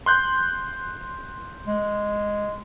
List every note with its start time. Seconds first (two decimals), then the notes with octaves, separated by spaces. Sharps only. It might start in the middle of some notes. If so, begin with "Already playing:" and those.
0.06 C6 F#6 G6
1.66 G#3